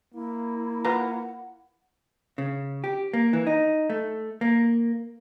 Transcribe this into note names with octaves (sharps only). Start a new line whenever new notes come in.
A#3 E4
F4 B4 F#5 A#5
C#3
G4
A#3
E3
D#4
A3
A#3